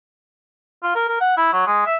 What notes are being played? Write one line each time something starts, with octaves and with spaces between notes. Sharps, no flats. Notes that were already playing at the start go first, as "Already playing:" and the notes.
F4
A#4
A#4
F#5
E4
F#3
G#3
E5